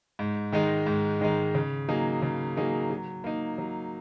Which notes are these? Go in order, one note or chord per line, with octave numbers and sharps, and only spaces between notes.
G#2
D#3 G#3 D#4
G#2
D#3 G#3 D#4
C#3
F#3 A#3 D#4 G#4
C#3
F#3 A#3 D#4 G#4
F#3
A#3 D#4
F#3